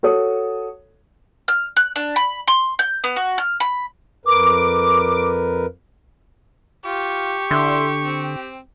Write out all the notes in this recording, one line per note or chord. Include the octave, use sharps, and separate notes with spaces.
F#4 A4 C#5 D#6
F6
F#6
D4
B5
C6
G6
B3
F#4
F6
B5
F2 A#4 B4 D6
F4 G4 C#6
D3 E4 E5 C6
C4